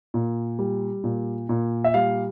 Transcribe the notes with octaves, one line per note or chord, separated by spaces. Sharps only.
A#2
G3
A#2
A#2
E5
G3 F5